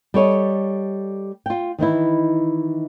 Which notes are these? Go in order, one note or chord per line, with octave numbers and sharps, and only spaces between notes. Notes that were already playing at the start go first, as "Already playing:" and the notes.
G3 A4 C#5 D#5
F4 G5
D#3 E3 D#4 E4